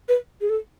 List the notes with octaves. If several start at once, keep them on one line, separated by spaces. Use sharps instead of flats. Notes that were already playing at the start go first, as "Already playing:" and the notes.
B4
G#4
A4